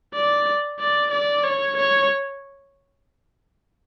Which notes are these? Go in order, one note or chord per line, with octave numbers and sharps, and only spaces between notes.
D5
D5
D5
C#5
C#5